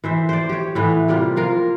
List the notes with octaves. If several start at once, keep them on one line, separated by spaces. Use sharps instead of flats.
E3 C5 E5
C5 D5
G4 C#5
A2 E3 B3
C3 G3 A#3 F4
A#3 F4 A#4